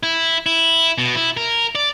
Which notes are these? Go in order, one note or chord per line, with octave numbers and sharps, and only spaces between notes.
E4
E4
B2
E4
A#4
D5